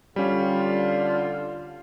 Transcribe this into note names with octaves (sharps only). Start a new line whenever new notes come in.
D3 G3 C#4 F4